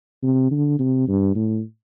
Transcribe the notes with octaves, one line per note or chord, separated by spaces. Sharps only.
C3
D3
C3
G2
A2